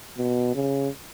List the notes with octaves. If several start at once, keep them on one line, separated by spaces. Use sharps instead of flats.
B2
C#3